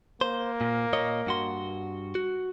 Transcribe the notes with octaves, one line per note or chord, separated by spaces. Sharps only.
A#3 C5
A#2
A#2 C#5 D#5
G2 F#4 C6
F#4